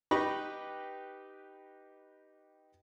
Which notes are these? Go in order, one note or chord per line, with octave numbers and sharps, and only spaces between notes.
D#4 G4 B4 D#5 B5 C#6